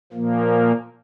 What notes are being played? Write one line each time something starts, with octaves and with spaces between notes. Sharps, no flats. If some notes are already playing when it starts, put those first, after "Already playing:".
A#2 F3 A#3